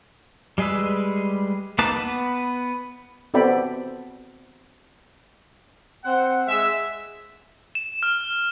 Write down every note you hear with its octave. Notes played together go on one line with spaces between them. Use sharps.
G3 G#3 G#4 B4 E6
A#3 D#4 B4 A5 D6
B3 B4
B3 C4 A4 D5 G5 B5
C4 F#5
G#3 E5
E7
F6